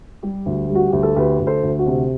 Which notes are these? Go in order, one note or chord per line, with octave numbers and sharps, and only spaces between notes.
G3 G4
D2
G3
F#4
D2 G4
A4
D2 G4 B4
D2
A4 C5
D2
F#4
C3